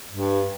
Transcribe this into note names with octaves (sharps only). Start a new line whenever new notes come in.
G2